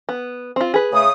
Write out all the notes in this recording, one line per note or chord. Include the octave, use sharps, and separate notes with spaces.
B3
C4 F4
G#4 B4
C#3 A3 D#6